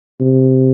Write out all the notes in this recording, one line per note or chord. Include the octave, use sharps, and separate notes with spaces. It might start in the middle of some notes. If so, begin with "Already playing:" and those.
C3